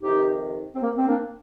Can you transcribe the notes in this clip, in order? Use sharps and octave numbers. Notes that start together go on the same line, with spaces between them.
F2 C3 D#3 D#4 G4
C4
A#3
C4
A#3 D4